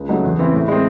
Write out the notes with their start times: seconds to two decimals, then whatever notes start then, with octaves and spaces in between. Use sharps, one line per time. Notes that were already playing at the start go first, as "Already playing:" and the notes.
Already playing: C#2
0.08 C#3 F#3 A3 D#4
0.24 E2
0.39 C#3 E3 C4
0.53 A2
0.68 G#3 C4